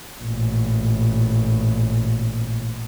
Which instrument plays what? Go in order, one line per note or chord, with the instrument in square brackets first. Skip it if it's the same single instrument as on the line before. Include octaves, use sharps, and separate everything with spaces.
[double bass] A1 A#2